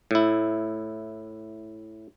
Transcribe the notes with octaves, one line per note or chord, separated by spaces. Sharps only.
A2 E4